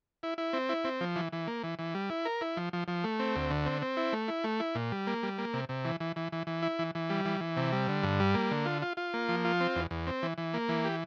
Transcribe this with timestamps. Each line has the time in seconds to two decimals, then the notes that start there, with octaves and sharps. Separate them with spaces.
0.23 E4
0.38 E4
0.53 C4
0.69 E4
0.84 C4
1.01 F3
1.16 E3
1.32 E3
1.47 A#3
1.64 E3
1.79 E3
1.95 G3
2.10 E4
2.25 A#4
2.41 E4
2.57 F3
2.73 F3
2.88 F3
3.04 A3
3.20 C4
3.36 D2
3.51 D3
3.66 C4
3.82 C4
3.97 E4
4.13 A3
4.28 E4
4.44 A3
4.60 E4
4.75 A#2
4.92 G3
5.07 A#3
5.23 G3
5.38 A#3
5.54 C3
5.69 C3
5.85 E3
6.00 E3
6.16 E3
6.32 E3
6.47 E3
6.63 E4
6.79 E3
6.95 E3
7.10 G3
7.25 E3
7.41 E3
7.56 C3
7.72 G3
7.88 D3
8.03 G2
8.20 G3
8.34 A#3
8.51 D3
8.66 F4
8.82 F4
8.97 F4
9.14 A#3
9.29 F3
9.45 F4
9.60 C4
9.76 E2
9.91 E2
10.07 C4
10.23 E3
10.38 E3
10.54 A#3
10.69 E3
10.85 G4